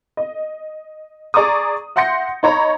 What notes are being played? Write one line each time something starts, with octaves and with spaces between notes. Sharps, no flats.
D#5
G#4 D5 A#5 C#6 D#6
E5 F#5 C6 G6 A#6 C#7
D#4 C#5 A#5 B5